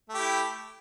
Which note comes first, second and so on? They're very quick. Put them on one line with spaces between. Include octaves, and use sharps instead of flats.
A3 G4 E4